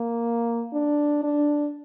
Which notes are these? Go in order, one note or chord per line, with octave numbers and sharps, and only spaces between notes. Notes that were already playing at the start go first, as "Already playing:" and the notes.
Already playing: A#3
D4
D4